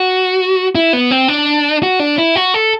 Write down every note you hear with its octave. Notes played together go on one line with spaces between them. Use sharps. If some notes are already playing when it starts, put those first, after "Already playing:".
Already playing: F#4
E4
B3
C4
D4
F#4
D4
E4
F#4
A4